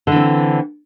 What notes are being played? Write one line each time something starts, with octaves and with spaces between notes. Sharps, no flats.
D3 E3 C4